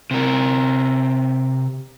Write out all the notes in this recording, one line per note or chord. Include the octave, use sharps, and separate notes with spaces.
C3 A#4